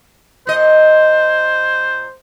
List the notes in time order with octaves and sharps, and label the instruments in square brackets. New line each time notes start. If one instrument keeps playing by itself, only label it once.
[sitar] A#2 D#5 [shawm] C5